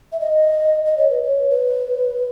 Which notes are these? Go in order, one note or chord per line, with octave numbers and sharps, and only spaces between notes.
E5
D#5
D#5
C#5
B4
C#5
B4